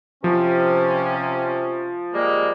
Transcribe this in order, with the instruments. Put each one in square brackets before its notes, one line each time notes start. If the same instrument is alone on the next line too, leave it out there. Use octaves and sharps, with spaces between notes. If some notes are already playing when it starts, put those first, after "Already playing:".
[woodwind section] C3 C#4 [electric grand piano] F3
[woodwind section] G3 G#3 A#3